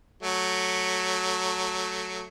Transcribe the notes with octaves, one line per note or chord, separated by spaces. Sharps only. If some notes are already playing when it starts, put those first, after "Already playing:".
F#3 A3